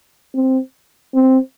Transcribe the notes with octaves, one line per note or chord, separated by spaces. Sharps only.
C4
C4